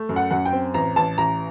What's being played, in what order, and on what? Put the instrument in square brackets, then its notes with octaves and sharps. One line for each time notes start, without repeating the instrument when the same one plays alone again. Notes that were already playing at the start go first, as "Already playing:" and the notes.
Already playing: [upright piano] A3
F#2
F#5
F#2 F#5
G5
C4
A1 A#5
A1 A5
A1 A#5